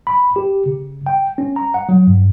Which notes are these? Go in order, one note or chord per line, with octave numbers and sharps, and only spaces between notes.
B5
G4
C#3
G5
C#4
A#5
F#5
F#3
G2